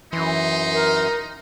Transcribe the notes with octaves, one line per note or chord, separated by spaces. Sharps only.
F#2 E3 D#4 C6
A#4